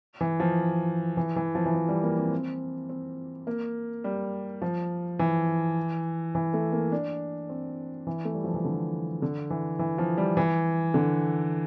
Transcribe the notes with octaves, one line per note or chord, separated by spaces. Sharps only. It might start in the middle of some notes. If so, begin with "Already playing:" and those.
E3
F3
E3
E3
F3
E3
F3
G3
A#3
C4
C4
C4
A#3
G3
F3
E3
E3
A3
A#3
D4
C4
E3
A3
G3
F3
E3
D3
D3
E3
E3
F3
G3
E3
D3